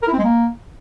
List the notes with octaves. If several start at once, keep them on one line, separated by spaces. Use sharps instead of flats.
A#4
E4
C4
G#3
A#3